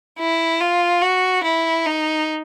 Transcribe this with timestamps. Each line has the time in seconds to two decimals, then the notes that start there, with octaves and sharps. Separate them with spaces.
0.19 E4
0.61 F4
1.02 F#4
1.44 E4
1.86 D#4